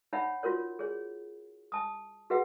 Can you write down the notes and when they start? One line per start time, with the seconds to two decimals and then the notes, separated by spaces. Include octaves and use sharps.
0.13 D#4 C#5 E5 F#5 B5
0.43 F4 F#4 A#4 C#5
0.79 G#4 C#5
1.72 A5 D#6
2.30 F#4 G#4 B4 E5 F#5